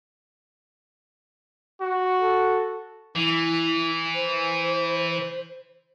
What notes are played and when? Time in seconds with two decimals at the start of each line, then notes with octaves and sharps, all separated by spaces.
1.81 F#4
2.20 A4
3.15 E3 E4
4.15 C5